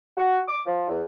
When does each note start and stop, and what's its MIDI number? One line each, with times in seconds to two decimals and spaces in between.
0.17 0.40 66
0.48 0.61 86
0.66 0.87 53
0.88 1.02 40